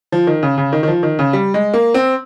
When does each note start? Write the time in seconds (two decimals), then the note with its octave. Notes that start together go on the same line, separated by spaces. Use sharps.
0.12 F3
0.27 D#3
0.43 C#3
0.58 C#3
0.73 D#3
0.83 D#3
0.88 F3
1.03 D#3
1.19 C#3
1.33 G3
1.54 G#3
1.74 A#3
1.94 C4